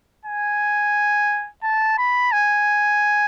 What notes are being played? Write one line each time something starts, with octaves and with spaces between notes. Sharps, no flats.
G#5
A5
B5
G#5